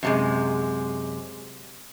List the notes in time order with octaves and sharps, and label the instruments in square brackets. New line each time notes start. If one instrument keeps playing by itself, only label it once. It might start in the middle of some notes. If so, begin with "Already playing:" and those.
[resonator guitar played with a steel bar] F#2 C3 G#3